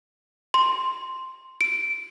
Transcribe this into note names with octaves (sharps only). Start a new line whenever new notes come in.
C6
D7